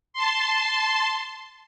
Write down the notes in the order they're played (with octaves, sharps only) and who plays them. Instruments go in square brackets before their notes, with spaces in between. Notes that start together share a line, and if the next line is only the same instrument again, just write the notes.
[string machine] A5 C6